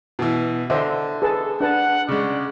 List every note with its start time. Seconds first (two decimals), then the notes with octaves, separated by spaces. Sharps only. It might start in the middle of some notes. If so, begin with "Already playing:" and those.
0.19 B2 E3
0.70 D3 C5 D#5 E5
1.22 G#4 A4 B4 A5
1.60 D4 B4 F#5 A5
2.09 C#3 G#3 D5